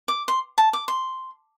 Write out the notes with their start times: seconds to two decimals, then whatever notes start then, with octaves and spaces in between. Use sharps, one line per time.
0.08 D6
0.28 C6
0.58 A5
0.73 D6
0.88 C6